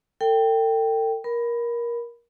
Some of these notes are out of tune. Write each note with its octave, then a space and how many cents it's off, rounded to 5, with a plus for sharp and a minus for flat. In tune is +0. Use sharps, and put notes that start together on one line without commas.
A4 +40 G5 +0
A#4 +20 B5 +5